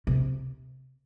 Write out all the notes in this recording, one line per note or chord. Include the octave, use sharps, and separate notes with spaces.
C3